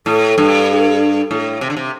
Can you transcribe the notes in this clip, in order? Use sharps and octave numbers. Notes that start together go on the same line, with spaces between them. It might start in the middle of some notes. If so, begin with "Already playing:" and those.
A2 A4
G2
A2
C3
D3
C3